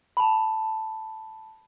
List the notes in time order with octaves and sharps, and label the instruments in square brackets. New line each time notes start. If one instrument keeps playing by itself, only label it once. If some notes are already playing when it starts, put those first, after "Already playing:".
[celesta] A5 B5